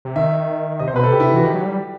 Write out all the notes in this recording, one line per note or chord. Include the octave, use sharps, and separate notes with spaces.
C3
D#3 E5
C3 D#5
C5
B2 B4
A4
C3 G4
E4
G4
E3 F#4
D#3 G4
F#3
G3